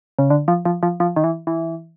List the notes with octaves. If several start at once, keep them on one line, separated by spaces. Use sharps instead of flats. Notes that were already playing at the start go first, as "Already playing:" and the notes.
C#3
D3
F3
F3
F3
F3
D#3
E3
E3